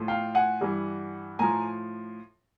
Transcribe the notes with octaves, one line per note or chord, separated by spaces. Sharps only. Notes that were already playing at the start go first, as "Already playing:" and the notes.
Already playing: A2 F3
F5 G5
F#5 G#5
G2 E3 G3
A2 F3 G#5 A#5